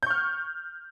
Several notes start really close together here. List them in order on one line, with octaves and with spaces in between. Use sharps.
G6 C#6 F6